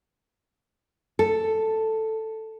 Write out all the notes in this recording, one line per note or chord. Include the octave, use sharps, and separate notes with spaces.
A4